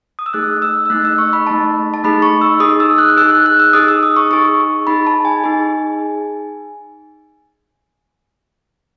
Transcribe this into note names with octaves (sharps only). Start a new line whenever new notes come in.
D#6
E6
A3 D#4 G#4 F#6
E6
E6
A3 D#4 G#4 F#6
E6
C#6
B5
A3 D#4 G#4 A5
A5
A3 D#4 G#4 B5
C#6
E6
D#4 G#4 D#6
E6
F#6
D#4 G#4 E6
F#6
F#6
E6
D#4 G#4 D#6
E6
D#6
C#6
D#4 G#4 C#6
D#4 G#4 B5
A5
G#5
D#4 G#4